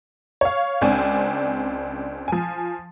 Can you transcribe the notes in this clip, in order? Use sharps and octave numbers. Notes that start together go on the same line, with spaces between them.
C#5 F5
C#2 C4 D4 G#5
F3 G#5